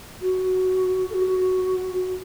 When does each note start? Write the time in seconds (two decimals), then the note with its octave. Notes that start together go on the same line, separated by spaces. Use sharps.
0.21 F#4
1.10 A4
1.14 F#4